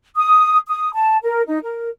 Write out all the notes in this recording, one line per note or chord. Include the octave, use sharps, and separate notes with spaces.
D#6
D#6
A5
A#4
D#4
A#4